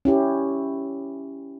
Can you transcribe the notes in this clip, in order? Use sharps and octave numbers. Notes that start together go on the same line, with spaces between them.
C#4 E4 G4